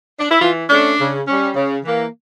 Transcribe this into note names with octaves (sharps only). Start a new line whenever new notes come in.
D4
E4
E3 F4
A3 C#4 D4
C#3
G3 C#4
C#3
E3 A#3